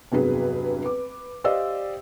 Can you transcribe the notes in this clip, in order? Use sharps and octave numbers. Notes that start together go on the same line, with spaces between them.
F1 E2 G2 F#3 G#4 B4
B4 D6
G4 C5 D5 D#5 F5 E6